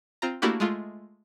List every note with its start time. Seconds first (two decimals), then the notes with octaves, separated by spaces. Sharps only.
0.22 C4 F4 A#5
0.42 A3 A#3 D4 E4 F#4 G4
0.60 G#3 A3 F4